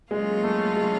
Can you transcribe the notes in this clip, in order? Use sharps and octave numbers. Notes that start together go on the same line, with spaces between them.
C#3 F#3 G#3 A#3 C#4 F4
A3
G#3